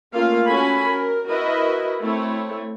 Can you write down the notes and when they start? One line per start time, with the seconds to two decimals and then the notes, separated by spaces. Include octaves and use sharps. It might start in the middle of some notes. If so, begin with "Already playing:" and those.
0.13 A3 A#3 C#4 F4 F5
0.47 C#4 F#4 A4 G#5 B5
0.90 A#4
1.27 E4 F#4 A#4 B4 D#5 E5
2.02 A3 C4 E4 C#5